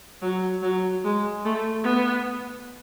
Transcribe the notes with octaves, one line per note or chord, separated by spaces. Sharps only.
F#3
F#3
G#3
A3
B3